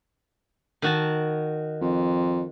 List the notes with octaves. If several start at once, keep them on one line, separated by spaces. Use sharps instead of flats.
D#3 F#4 A5
F2